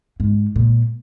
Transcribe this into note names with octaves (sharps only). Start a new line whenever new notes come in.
G#2
A#2